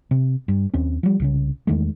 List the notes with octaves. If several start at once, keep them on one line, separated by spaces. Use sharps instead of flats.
C3
G2
D#2 C4 C#4
F3 G3
C2 C#3 C#4
E2 D#3 G#3 A3